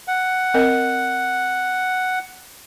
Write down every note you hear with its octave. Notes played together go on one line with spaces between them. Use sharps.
F#5
C4 A#4 D#5